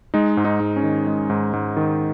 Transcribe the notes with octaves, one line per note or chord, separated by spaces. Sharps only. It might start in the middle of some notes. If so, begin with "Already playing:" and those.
G#3 D#4
G#2
D#4
G#2
C#4
D#3
G#3
G#2
G#2
D#3